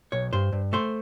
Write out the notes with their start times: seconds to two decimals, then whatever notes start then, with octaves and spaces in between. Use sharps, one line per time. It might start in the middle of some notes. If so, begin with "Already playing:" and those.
0.12 B1 C#5
0.33 G2 C5
0.52 G2
0.73 A3 C5